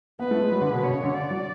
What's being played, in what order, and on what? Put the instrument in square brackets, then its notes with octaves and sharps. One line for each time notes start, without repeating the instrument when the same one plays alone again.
[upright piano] B3 [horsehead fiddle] B4
[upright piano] A3
G#3
F#3
D3
B2
[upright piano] B2 [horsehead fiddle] C#5
[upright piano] C#3
D3
[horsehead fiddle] D5
[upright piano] F#3